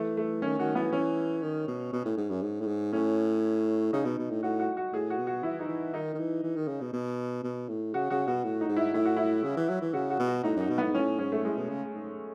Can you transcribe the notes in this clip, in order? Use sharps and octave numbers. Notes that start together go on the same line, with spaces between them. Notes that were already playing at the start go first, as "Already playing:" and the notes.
Already playing: E3 A3
A3
D#3 C#4
D#3 F#4
E3 B3
E3 C#4
D#3
B2
B2
A2
G#2
F#2
G#2
A2
G#2
A2 C#4
C#3 D#4
B2
B2
A2
A2 F#4
F#4
F#4
A2 G#4
F#4
B2
F#4
E3 E4
D#4
E3
D#3 D#4
D#3
E3
E3
D#3
C#3
B2
B2
B2
A2
C#3 F#4
C#3 F#4
B2 F#4
A2
D#4
G#2
E4
A2 E4
F#4
E4
C#3
E3
F#3
E3
C#3 F#4
F#4
B2
F#4
A2 D#4
F#2 D#4
B2
A2 B3
G#2
A2 C#4
G#2 C#4
A3
A2 G#3
B2
C#3
G#2